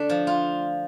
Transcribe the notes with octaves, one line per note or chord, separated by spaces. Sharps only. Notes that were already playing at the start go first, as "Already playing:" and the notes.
Already playing: D3 A3 D4
F3
F4